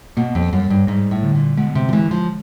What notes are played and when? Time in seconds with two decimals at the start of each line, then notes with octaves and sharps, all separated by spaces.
0.17 B2 A#3
0.35 F2
0.53 F#2 G3
0.70 G2
0.87 G#2 G3
1.11 A2
1.23 D3
1.35 A#2
1.57 B2 G#3
1.75 C3
1.89 F3
1.93 E3 G#3
2.11 F3